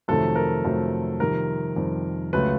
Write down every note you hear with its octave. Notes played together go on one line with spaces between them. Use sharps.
F2 C3 D#3 F#3 A3 A4
A#4
F2 C3 D#3 F#3 A3
F2 C3 D#3 G3 A#4
F2 C3 D#3 G3
C#2 C#3 F#3 A3 B4